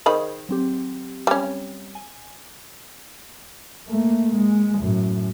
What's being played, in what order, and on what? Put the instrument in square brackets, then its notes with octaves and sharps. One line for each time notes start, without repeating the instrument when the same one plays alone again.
[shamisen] D#3 D#5 B5 [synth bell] G#4 C5
[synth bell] F#3 C4 G4
[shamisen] G3 C#4
[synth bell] G#5
[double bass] A3 A#3
G#3
F#2 A2